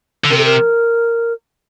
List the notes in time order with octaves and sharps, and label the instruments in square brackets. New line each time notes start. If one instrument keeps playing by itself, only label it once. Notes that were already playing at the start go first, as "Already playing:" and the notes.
[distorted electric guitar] D3
[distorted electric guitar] C3 [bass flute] A#4
[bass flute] A4
A#4